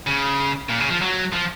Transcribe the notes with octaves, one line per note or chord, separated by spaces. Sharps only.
C#3
A#2
C#3
F3
F#3
F3